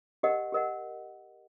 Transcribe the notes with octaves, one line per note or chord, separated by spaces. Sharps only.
G4 A#4 D#5 F#5
G4 A#4 D#5 F#5